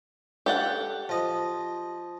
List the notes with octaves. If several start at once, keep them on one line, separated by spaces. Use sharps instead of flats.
G4 A4 F#5
F3 D#5